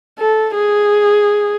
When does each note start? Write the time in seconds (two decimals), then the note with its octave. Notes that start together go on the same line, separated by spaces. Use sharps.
0.19 A4
0.55 G#4